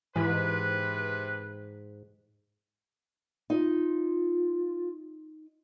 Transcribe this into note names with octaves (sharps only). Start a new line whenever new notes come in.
G#2 C3 E3 B4
D#4 F4